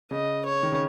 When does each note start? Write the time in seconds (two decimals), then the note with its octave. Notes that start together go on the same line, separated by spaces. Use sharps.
0.11 C#3 D#5
0.46 C#5
0.63 D#3
0.72 C#3